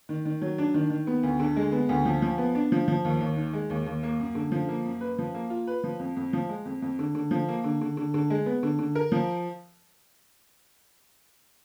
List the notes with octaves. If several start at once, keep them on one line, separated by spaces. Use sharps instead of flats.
D#3
D#3
F#3
D4
D#3
D#3
B3
D2
D3
G#3
B3
D2
F3
F3
B3
D4
F3
F3
D#2
D#2
D#3
G#3
D#2
D#2
A#3
F#2
D3
F3
A#3
F#2
B4
F3
A#3
F4
B4
F3
F2
F2
F3
G#3
F2
F2
D3
D3
F3
A#3
D3
D3
D3
D3
G#3
B3
D3
D3
A#4
F3